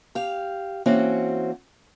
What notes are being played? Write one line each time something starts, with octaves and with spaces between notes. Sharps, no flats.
G4 F5
E3 A#3 C4 C#4 F#4